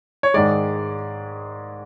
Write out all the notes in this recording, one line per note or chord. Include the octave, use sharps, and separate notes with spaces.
C#5
G#2 D#3 G#3 D5